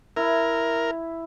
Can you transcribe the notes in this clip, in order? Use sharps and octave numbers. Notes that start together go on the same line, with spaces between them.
E4 A#4